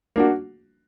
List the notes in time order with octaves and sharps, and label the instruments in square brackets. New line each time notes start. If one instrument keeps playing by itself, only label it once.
[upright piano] A#3 D4 F#4